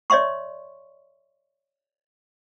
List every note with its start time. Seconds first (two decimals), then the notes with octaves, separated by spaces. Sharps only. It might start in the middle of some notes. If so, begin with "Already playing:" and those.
0.10 C#5 D5 E5 C6 C#6